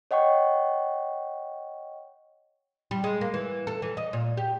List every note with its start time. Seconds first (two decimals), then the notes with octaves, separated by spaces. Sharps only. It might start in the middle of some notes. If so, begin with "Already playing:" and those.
0.11 C#5 D#5 F#5 G5 C#6
2.91 G3
3.04 G#3
3.21 A#3
3.34 E3
3.67 A4
3.82 E3
3.97 D#5
4.13 A#2
4.37 G4